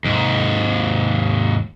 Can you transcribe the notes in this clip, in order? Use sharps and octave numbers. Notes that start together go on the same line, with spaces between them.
D#2 G#2